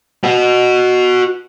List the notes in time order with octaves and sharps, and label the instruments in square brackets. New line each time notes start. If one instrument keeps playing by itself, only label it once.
[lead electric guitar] F#4 B4